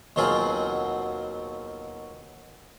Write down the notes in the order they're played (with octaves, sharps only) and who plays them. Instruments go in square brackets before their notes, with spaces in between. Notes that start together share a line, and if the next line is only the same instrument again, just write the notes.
[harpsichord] D#2 B2 F#3 C4 F4 G#4